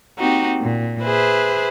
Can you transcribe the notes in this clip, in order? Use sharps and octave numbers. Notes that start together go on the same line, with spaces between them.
A#3 C4 D#4 F#4 G4
A#2
G#4 B4 C5 E5